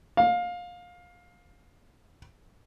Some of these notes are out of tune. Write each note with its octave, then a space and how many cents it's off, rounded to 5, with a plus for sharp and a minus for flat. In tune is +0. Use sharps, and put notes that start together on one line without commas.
F5 +20